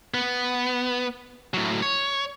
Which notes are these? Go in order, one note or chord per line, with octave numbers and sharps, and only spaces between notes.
B3
A2 F#3
C#5